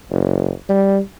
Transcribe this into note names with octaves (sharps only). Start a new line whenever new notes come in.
F#1
G3